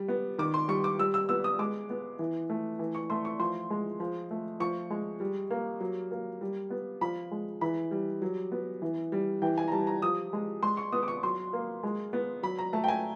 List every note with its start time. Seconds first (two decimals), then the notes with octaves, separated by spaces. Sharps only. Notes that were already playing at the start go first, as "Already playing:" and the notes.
Already playing: G3
0.08 B3
0.38 D#3 D6
0.54 C6
0.68 G3 C#6
0.84 D6
0.99 G3 E6
1.14 E6
1.29 B3 E6
1.44 D#6
1.59 G#3 D6
1.90 B3
2.19 E3
2.50 A3
2.79 E3
2.95 C#6
3.10 A3 C6
3.25 C#6
3.39 F3 C6
3.70 G#3
4.00 F3
4.31 A3
4.60 F3 C#6
4.90 G#3
5.20 G3
5.51 A#3
5.80 F#3
6.11 A#3
6.41 G3
6.70 B3
7.01 F3 B5
7.31 G#3
7.61 E3 B5
7.91 G3
8.22 F#3
8.52 B3
8.82 E3
9.12 G3
9.42 E3 G5
9.58 G#5
9.68 A#5
9.72 G3 A5
9.87 A#5
10.02 F3 D#6
10.33 G#3
10.63 G#3 C6
10.77 C#6
10.92 B3 D#6
11.03 D6
11.08 C#6
11.23 F#3 C6
11.53 A#3
11.83 G#3
12.13 B3
12.43 F#3 B5
12.58 A#5
12.73 A3 A5
12.84 G5
12.88 G#5